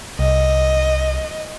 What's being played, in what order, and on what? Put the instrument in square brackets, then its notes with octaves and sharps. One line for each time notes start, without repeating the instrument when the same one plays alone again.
[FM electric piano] C2 [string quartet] D#5